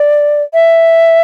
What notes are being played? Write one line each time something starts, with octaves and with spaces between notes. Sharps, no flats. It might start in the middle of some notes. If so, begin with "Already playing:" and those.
Already playing: D5
E5